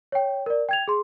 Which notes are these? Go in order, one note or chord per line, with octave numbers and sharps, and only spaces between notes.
C#5 G5
A#4 D5
G5 G#6 F7
G#4 C6